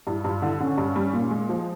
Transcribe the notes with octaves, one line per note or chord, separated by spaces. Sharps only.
G2 E4
G2 F4
D3 E4
D3 C#4
G2
G3
A#2
G#3
F3